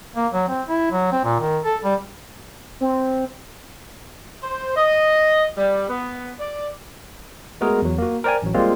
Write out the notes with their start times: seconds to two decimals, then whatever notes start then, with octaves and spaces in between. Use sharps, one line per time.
0.16 A#3
0.33 F#3
0.49 C4
0.69 E4
0.92 F#3
1.12 C4
1.24 A#2
1.40 D#3
1.64 A4
1.84 G3
2.81 C4
4.42 C5
4.76 D#5
5.56 G3
5.88 B3
6.39 D5
7.61 G#3 A3 B3 F#4 G#4 A#4
7.82 E2 F#3
7.98 A#3 F#4
8.24 A#4 C5 D5 G5 G#5
8.42 A1 F#3
8.54 G3 G#3 A#3 C4 F4